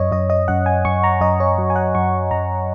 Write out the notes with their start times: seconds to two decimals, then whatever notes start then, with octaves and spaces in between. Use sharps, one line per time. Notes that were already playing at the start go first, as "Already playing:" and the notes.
Already playing: F#2 C#5 D#5
0.12 F#2 D#5
0.30 D#5
0.48 F#2 F#5
0.66 G#5
0.85 F#2 C#6
1.04 A#5
1.21 F#2 D#5
1.40 C#5
1.58 F#3
1.70 G#5
1.76 F#5
1.95 F#2 C#6
2.31 F#2 A#5